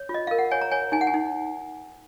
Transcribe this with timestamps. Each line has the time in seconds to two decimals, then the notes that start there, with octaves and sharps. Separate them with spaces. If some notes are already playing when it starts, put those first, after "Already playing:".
Already playing: C#5
0.09 F4
0.14 D#5
0.27 A#4 F5
0.39 F#5
0.51 C#5 G#5
0.62 A#5
0.71 C#5 G#5
0.92 D#4 G#5
1.01 F#5
1.07 G#5
1.14 D#4